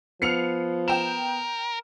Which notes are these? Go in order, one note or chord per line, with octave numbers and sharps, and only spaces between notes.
F3 B3 F6 C7 C#7 F7
A#4 G5 E7